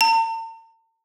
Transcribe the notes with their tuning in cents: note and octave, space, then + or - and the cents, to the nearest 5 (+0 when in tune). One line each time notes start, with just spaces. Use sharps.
A5 +45